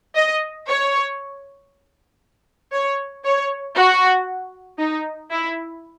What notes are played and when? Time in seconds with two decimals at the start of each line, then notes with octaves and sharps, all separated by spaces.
0.15 D#5
0.68 C#5
2.72 C#5
3.25 C#5
3.76 F#4
4.78 D#4
5.30 E4